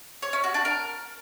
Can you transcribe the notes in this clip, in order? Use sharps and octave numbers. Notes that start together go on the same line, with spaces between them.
C#5
C#4
F#4
D4
A#4